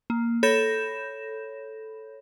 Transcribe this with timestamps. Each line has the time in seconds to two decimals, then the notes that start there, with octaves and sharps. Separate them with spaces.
0.10 A#3
0.43 A4 C#5 B5 G6 A#6 E7